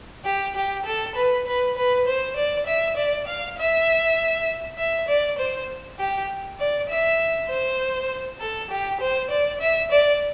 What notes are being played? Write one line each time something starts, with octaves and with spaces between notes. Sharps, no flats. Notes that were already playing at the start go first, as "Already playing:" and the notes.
G4
G4
A4
B4
B4
B4
C5
D5
E5
D5
F5
E5
E5
D5
C5
G4
D5
E5
C5
A4
G4
C5
D5
E5
D5